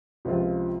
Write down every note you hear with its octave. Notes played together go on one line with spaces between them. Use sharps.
C#2 C3 F3 C4 F4